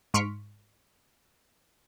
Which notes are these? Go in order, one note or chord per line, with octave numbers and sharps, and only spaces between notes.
G#2 C6 C#6 F6 B6 D7